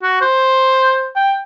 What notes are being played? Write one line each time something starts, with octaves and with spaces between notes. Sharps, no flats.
F#4
C5
G5